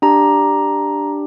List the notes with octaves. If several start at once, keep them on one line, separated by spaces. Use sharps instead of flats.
D4 G4 A#5